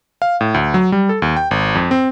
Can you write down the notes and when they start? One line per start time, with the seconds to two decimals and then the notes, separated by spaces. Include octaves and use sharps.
0.22 F5
0.41 A2
0.54 D2
0.74 F#3
0.92 G3
1.09 A4
1.22 D#2
1.37 G5
1.51 G#1
1.75 F2
1.91 C4